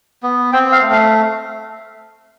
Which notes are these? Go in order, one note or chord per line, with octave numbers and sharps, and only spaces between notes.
B3
C4 G5
F5
A3
F5